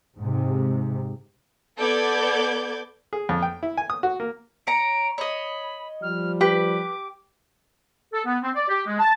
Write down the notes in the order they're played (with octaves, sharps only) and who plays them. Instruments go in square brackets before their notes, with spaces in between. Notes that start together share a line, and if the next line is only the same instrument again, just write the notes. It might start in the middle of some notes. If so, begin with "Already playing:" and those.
[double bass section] G#2 C3
[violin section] B3 A4 D5 D6 G6 G#6
[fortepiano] G#4
F2
G5
E4
G#5
D#6
F#4
A#3
[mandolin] C#5 A#5 [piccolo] D7
[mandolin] C#5 D#5 [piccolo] B5
[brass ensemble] F3 G3 [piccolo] F6
[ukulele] G4 [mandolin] B4 [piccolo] D6
[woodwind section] A4
B3
C4
D5
G4
G#3
A5